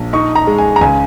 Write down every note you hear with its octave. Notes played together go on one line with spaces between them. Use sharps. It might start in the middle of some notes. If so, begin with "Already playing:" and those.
Already playing: A#1
D#4 C#6
A#5
G#3
G#5
A#5
C#2 G#5